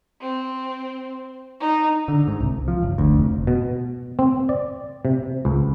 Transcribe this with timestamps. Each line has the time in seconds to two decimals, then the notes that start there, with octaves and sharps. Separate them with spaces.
0.22 C4
1.60 D#4
2.08 D3
2.28 G#2
2.40 C2
2.68 F3
2.83 F#1
2.98 D2
3.18 F1
3.47 B2
4.19 C4
4.49 D5
5.05 C3
5.45 C#2